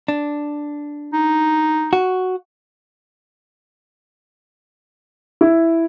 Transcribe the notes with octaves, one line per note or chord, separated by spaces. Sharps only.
D4
D#4
F#4
E4